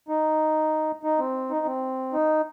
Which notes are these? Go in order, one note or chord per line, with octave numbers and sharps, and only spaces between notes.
D#4
D#4
C4
D#4
C4
D#4